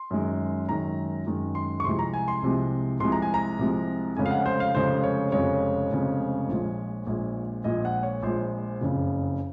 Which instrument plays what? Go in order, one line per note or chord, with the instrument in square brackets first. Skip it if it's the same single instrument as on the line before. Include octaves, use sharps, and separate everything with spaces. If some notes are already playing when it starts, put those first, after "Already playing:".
Already playing: [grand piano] C6
F#2 D#3 G#3
F#2 D#3 G#3 A#5
F#2 D#3 G#3
C6
C#6
C2 C3 F3 G#3 C6
A#5
G#5
C6
C2 C3 F3 G#3
C2 C3 F3 G#3 C6
A#5
G#5
A#5
C2 C3 F3 G#3
F1 F2 C#3 G#3 G#5
F5
F#5
C5
F5
F1 F2 C#3 G#3 C5
C#5
F1 F2 C#3 G#3 C#5
F1 F2 C#3 G#3
A#1 A#2 F3 G#3
A#1 A#2 F3 G#3
A#1 A#2 F3 G#3 D#5
F#5
C#5
A#1 A#2 F3 G#3 C5
F#1 F2 C#3